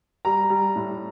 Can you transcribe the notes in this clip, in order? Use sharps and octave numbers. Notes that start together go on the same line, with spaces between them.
G3 A#5
G3
A2